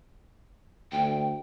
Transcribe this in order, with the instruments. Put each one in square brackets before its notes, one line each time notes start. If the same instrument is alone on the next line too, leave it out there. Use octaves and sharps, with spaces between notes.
[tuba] D2 [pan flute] G5